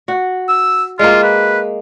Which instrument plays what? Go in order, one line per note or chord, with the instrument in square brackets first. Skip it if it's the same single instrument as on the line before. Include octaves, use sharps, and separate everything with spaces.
[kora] F#4
[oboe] E6
[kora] G#3 A#3 [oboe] F4
[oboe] B4